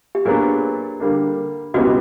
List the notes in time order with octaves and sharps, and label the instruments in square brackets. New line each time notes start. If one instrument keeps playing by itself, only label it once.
[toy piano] G4
[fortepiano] A#2 F#3 B3 D4 [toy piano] G#4
[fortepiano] D3 G3 A#3 D4
[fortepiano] C#2 B2 G3 B3 E4 [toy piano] F#4